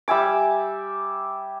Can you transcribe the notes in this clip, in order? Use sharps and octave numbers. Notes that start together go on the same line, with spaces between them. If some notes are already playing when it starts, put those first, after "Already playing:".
G3 E5 G#5 D6